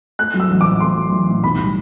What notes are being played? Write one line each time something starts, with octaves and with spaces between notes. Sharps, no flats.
A3 F#6
F#3
E6
A1
D6
A2
A3 C6
F#3
A1
A2
B1 B5
G3